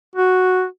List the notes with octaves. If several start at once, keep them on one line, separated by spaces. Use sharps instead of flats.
F#4